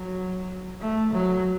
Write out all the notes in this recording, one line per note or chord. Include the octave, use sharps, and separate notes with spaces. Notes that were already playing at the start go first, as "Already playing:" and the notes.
Already playing: F#3
A3
F#3